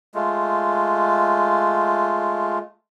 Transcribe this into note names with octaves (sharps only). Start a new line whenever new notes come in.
G#3 A3 F4